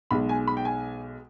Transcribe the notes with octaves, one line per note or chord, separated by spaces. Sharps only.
B1 B2 G#3 B5
G#5
B5
G5
G#5